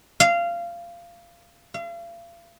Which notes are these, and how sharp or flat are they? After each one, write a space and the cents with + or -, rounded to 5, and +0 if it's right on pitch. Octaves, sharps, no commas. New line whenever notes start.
F5 -20
F5 -40